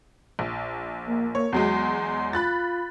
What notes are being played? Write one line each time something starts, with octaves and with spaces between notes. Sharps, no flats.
A#1
A#3
A#3 C#5
E2 F#3 G#3 C6
F4 B5 F#6 A6